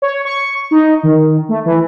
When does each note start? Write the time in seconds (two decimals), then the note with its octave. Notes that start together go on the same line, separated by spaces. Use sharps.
0.02 C#5
0.25 C#6
0.71 D#4
1.03 D#3
1.49 A3
1.66 E3